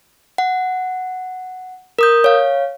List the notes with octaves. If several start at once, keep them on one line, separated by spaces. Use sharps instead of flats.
F#5
A#4 D#6 G6
C#5 F5